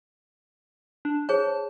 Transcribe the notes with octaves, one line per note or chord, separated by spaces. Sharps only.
D4
G#4 C5 C#5 A5